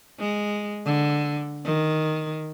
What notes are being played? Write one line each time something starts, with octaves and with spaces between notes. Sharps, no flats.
G#3
D3
D#3